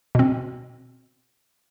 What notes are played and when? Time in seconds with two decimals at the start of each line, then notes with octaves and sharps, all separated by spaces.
0.15 B2 C4